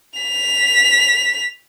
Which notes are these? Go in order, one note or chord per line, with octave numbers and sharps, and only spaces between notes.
B6 F7